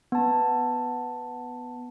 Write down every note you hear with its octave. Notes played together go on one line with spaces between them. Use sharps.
B3 A5